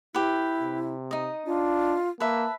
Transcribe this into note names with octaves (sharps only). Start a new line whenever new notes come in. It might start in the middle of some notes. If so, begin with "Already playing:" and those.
E4 G4 B4
C3
D#4 D#5
D4 F4
A#3 B4 E5 A5